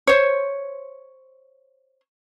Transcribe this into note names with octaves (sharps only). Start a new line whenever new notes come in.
C5 C#5